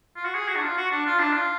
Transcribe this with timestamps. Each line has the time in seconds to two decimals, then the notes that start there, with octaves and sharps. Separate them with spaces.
0.16 F4
0.25 F#4
0.34 G#4
0.48 F#4
0.56 D4
0.63 F4
0.77 F#4
0.91 D4
1.06 F4
1.19 D4
1.33 F4